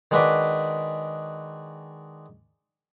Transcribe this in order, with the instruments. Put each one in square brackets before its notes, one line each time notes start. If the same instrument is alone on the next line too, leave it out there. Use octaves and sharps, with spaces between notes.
[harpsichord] D#3 G#3 D4 F#4 B4 D5